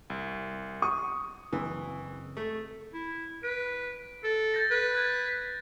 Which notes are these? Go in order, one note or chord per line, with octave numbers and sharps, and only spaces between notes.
C2
C#6 D#6
F#1 E3 C4
A3
E4
B4 D7
A4
G6 A6 A#6
B4
F#6 G#6 A6